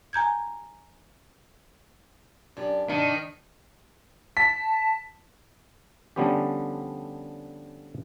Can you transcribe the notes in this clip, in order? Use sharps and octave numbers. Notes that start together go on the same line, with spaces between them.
G#5 A#5 G6 G#6
F#2 D4 G4
G#2 C3 D#3 D4
A5 B6
D3 F3 G3 B3 C#4 G4